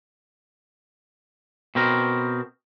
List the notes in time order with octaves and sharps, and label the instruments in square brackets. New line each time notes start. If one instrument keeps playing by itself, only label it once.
[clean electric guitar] B2 C4 A#4